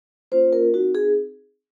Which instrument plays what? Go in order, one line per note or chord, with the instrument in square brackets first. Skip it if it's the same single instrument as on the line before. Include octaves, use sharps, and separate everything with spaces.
[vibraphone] A#3 C#4 F4 C5
A#4
C4 D#4 F#4
G#4